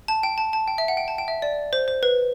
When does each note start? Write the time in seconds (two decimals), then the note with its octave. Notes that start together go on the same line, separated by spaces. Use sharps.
0.08 A5
0.23 G5
0.38 A5
0.53 A5
0.68 G5
0.78 E5
0.88 F#5
0.97 G5
1.08 A5
1.18 G5
1.28 E5
1.42 D5
1.73 C5
1.88 C5
2.03 B4